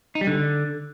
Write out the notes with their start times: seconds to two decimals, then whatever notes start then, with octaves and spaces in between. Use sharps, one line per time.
0.15 D#4
0.21 G3
0.27 D3